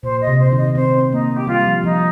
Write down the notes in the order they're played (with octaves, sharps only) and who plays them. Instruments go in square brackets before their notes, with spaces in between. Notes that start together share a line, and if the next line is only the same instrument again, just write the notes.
[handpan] A#2 [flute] C5
[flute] D#5
[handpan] C3
[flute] C5
[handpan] D#3
[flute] D#5
[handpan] C4 [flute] C5
[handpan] A#3 [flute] D#4
[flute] G4
[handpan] G3 [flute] F4
[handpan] F3
[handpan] F3 [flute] D#4